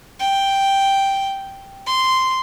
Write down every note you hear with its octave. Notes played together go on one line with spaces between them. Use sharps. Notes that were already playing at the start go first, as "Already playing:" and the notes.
G5
C6